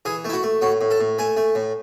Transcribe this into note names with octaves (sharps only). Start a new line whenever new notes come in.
E3 G#4
A3 E4
F#4
A3
A2 F#4
A2
A4
A2
A3 G#5
A3
A2